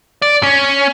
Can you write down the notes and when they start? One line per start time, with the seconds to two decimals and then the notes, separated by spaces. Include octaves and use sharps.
0.22 D5
0.43 C#4